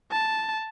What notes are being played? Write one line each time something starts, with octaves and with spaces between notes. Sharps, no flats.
A5